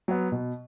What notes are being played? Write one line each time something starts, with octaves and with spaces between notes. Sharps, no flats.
F#3 B3
B2